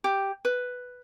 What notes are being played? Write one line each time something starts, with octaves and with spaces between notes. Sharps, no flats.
G4
B4